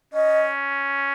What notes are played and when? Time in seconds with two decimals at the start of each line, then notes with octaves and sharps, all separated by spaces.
0.13 C#4 D#5